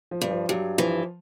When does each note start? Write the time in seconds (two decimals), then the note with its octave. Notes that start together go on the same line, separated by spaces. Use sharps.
0.11 F3
0.21 G2
0.31 F3
0.49 G2 F#3
0.78 E3 F3